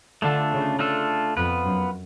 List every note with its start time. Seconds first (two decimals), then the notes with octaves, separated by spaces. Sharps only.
0.22 D3 A3 D4 F4 A4
0.51 C#3
0.79 A3 D4 F4 A4
1.37 F2 B3 F4 B4
1.65 F#2